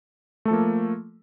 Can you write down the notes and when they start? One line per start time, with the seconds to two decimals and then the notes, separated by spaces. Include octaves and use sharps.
0.45 A3
0.48 A4
0.51 F3
0.53 A#3